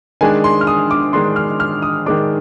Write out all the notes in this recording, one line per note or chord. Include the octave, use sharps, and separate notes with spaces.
D#3 G#3 D4 G#5
C6
F6
D#6
D6
D#3 G#3 D4 C6
F6
F6
D#6
D#3 G#3 D4 D6